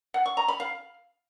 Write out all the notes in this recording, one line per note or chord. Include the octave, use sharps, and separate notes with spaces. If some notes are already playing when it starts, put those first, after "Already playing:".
F#5
C#6
A#5
B5
F5